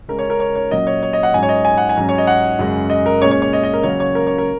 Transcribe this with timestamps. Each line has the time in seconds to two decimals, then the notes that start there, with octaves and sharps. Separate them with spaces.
0.08 C#3 G#3 C#4 A#4
0.19 C#5
0.30 A#4
0.40 C#5
0.56 C#5
0.71 A#2 F#3 C#4 D#5
0.87 C#5
1.03 C#5
1.13 D#5
1.23 F#5
1.33 G#2 F#3 C#4 G#5
1.43 C#5
1.49 D#5
1.65 G#5
1.77 F#5
1.89 G#5
1.96 G#2 F#3 C#4
2.09 C#5
2.18 D#5
2.27 F#5
2.59 F#2 C#3 G#3 C#4
2.90 D#5
3.06 A#4
3.21 A#2 G#3 C#4 C#5
3.31 C#5
3.42 C#5
3.53 D#5
3.64 D#5
3.73 A#4
3.83 C#3 F#3 A#3 C#4 C#5
4.00 C#5
4.15 A#4
4.27 C#5
4.38 A#4